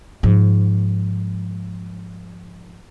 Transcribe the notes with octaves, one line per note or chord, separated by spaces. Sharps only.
G#2 F3